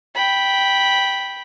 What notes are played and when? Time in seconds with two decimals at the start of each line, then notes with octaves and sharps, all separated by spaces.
0.15 G5 B5